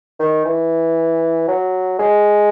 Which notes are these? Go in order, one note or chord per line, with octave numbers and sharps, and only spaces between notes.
D#3
E3
F#3
G#3